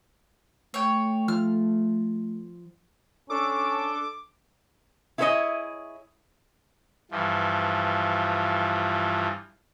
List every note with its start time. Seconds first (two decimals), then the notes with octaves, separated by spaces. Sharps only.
0.74 A3 C#5 G5
1.28 F3 F6
3.30 C#4 D4 A4 D6
5.18 E4 F4 G#4 C5 C#5 D#5
7.11 G2 E3 F3